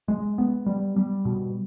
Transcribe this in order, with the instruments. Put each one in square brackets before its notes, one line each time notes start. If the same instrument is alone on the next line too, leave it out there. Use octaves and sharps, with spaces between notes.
[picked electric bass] G#3
B3
G3
G3
B2